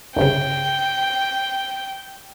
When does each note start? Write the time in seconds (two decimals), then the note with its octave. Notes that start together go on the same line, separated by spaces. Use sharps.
0.16 G1 C2 C#3 G5